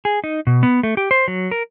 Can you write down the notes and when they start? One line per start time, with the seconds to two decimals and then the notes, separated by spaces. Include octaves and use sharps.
0.05 G#4
0.24 D#4
0.47 B2
0.63 B3
0.83 A3
0.97 G4
1.11 C5
1.28 F#3
1.51 A#4